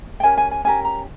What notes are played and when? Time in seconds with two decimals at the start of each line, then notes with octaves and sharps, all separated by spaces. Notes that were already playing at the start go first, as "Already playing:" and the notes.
0.20 G5
0.23 C#4 G4 A#4 G#5
0.38 G#5
0.51 G#5
0.64 C#4 G4 A#4 G#5
0.85 A#5